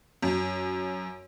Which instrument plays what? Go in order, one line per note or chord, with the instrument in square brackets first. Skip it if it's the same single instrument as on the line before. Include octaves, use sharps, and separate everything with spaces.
[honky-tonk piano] F#2